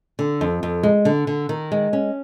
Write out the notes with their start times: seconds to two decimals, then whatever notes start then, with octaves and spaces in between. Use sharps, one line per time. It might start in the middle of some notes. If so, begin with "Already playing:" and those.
0.19 D3
0.41 F2
0.63 F2
0.83 G#3
1.05 D3
1.27 D3
1.49 D#3
1.72 G#3
1.93 C#4